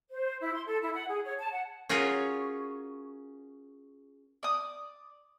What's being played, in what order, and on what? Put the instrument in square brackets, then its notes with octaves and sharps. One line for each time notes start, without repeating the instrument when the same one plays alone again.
[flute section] C5
E4
C6
A4
E4
F#5
G#4
C#5
A5
F#5
[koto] C#4 F4 F#4 G#4 A#4 C#5
[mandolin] D5 D#6